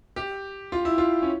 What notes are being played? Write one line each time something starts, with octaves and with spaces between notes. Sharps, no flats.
G4
F4
E4
F4
C#4